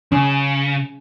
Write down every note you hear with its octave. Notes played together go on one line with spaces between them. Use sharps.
C#3 C#4